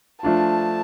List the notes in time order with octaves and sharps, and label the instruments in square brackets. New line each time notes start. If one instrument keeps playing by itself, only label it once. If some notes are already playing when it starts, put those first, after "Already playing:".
[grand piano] F3 A3 D4 F4 [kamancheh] A5